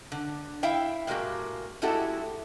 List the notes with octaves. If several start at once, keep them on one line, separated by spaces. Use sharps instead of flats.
D3
E4 E5 F5 G5
A2 F3 G#3 A#3 F#4 G4
G#3 A3 E4 F#4 G4 A4